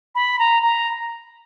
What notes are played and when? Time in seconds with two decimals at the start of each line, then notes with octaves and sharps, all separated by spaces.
0.15 B5
0.39 A#5
0.63 A#5